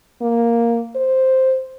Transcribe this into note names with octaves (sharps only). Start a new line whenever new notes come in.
A#3
C5